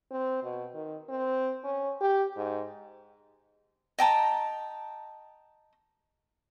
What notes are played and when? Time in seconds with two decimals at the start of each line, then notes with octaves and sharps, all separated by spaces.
0.11 C4
0.43 B2
0.74 D#3
1.09 C4
1.64 C#4
2.01 G4
2.36 G#2
3.99 D#5 G5 A5 A#5